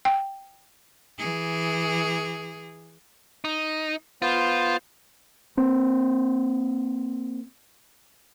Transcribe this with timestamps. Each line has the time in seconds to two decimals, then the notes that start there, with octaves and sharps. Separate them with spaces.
0.05 G5
1.18 E3 G#4
3.44 D#4
4.22 B3 F4 C5
5.57 A#3 C4